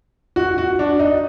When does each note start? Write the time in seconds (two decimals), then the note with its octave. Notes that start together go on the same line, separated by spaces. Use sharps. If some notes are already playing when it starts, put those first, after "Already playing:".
0.36 F#4
0.58 F#4
0.79 D4
1.00 D#4